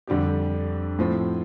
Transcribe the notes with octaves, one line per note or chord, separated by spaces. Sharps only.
F2 D3 G3 D4 G4
A2 F3 C4